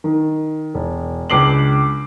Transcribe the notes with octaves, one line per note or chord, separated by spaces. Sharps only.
D#3
E1
C#2 D4 D6 C7 F#7